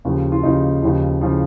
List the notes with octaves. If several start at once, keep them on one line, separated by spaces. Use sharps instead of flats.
D#2 C#3 F3
F4
D#2 C#3 F3 D#4
D#2 C#3 F3
C#3 F3